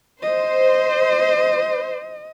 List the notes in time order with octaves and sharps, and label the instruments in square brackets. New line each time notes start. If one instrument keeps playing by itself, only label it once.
[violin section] C5 [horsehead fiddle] D#5